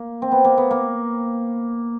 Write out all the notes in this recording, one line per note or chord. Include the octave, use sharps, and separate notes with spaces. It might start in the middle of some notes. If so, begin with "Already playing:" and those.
Already playing: A#3
C4
B3
A#3
B3
A#3